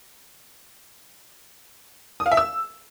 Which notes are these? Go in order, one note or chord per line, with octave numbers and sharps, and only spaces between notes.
D#6
F5
E5
E6